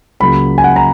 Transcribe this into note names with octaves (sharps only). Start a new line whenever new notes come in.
C#2 C#3 F#3 A#3 B5
G#5
F#5
A#5